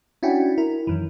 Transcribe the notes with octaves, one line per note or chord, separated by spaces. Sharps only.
C#4 D4 E4 F#4 G5 G#5
E4 A#4
F#2 D#3 E3